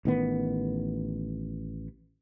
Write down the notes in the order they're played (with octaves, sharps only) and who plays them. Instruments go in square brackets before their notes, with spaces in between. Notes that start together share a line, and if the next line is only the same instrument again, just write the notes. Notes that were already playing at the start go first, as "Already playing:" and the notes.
[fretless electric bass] A1 D#3 B3